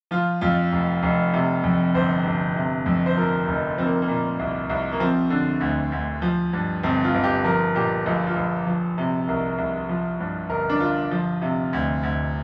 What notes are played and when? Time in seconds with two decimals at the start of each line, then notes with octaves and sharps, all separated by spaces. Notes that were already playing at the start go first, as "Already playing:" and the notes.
0.11 F3 F4
0.41 F2 F4
0.72 F1
1.03 F1
1.34 C3
1.64 F2
1.94 G1 C5
2.25 G1
2.56 C3
2.86 F2
3.06 C5
3.17 F3 A#4
3.48 F1
3.78 F3 C4
3.85 A#3
4.02 A#3
4.08 A#2
4.39 C2
4.69 C2
4.92 A#3
5.00 F3 C4
5.30 D3
5.61 D2
5.92 D2
6.22 F3
6.53 G2
6.83 G1 C4
7.04 F4
7.14 G1
7.24 G4
7.45 F3 A#4
7.75 A#2 G4
8.06 A#1 F4
8.27 F4
8.36 A#1
8.66 F3
8.98 C3
9.28 C2 A#4
9.58 C2
9.89 F3
10.20 G2
10.50 G1 A#4
10.70 D4
10.80 G1 F4
11.11 F3
11.42 C3
11.73 D2
12.03 D2